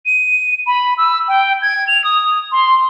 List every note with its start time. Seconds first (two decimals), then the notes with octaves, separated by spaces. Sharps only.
0.06 D#7
0.67 B5
0.98 E6
1.28 G5
1.62 G#6
1.88 F7
2.04 D#6
2.52 C6